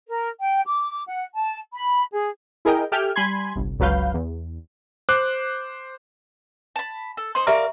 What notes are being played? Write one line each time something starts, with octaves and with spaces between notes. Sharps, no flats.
A#4
G5
D6
F#5
A5
B5
G#4
E4 G#4 A#4 D#5 G5
G4 A4 E5 G5 G#5 F6
G3 G#5 B5 C6 G#6
G1 C2
G1 C#2 F#3 B4 F5 G6
E2
C5 D6 F#6
A5 B5
A4
D#4 C5 C6
G4 A#4 D5 E5 F5 A#5